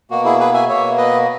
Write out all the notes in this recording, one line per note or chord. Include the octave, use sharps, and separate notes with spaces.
B2 A#3 F#4
E4 G#4
G#4 B4
E5 G#5
B2 A#3 C#5 E5
B4 D#5